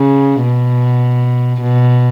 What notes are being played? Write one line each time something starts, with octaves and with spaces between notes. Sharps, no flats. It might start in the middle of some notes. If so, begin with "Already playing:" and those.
Already playing: C#3
B2
B2